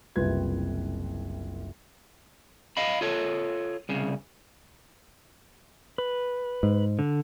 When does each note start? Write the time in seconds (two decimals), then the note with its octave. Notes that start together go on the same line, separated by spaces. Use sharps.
0.16 F#1 C2 C3 F4 B4 G#6
2.77 D#5 F5 B5
3.01 F4 A4 C#5
3.89 C2 C#3
5.98 B4
6.63 G#2
6.99 D3